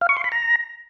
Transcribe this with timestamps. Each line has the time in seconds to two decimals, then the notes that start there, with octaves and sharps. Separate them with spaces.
0.01 F5
0.09 C#6
0.17 C6
0.24 B5
0.32 A#5